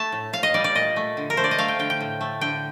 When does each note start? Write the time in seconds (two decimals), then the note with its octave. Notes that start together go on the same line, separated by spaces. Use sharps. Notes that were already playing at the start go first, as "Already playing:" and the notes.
Already playing: A3 A5
0.12 A2
0.33 A2 F5
0.43 D#5
0.54 G3 D5
0.64 D5
0.75 A#2 D#5
0.96 A3
1.17 D3
1.30 A#4
1.37 A3 C5
1.44 D5
1.51 D#5
1.58 A3 F5
1.68 G5
1.79 D3 G5
1.90 G5
2.01 A2
2.21 A3
2.41 D3 G5